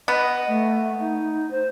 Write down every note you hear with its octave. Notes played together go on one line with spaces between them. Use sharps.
B3 D#5
A3
D#4
C5